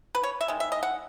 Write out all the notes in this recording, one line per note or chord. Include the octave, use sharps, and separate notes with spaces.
B4
C#5
E5
D#3 G#3
E5
D#5
F#5